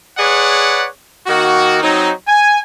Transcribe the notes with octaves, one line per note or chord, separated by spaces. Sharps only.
G#4 B4 C#5 D5 F#5
D#3 A#3 F#4
F#3 C4 D#4
G#5